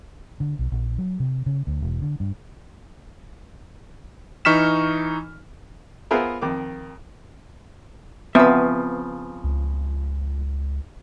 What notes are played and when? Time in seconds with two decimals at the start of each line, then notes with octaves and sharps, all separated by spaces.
0.40 D3
0.59 B1
0.72 A#1
0.98 F#3
1.20 C3
1.46 C#3
1.67 D2
1.82 E1
2.02 D3
2.20 G2
4.45 E3 D#4 C#6 F6 B6 E7
6.11 B3 F4 G#4 A#4 C5 E5
6.41 F2 D#3 D6
8.35 C#3 F3 B3 C4 B4 E5
9.44 C#2